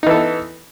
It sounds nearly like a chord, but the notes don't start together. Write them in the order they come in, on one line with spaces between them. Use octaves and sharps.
D#4 E3 A4 B3